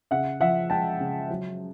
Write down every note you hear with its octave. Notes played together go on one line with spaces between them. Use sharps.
C#3 E5 F#5
F3 E5 F#5
G#3 G5 A5
C#3
F#3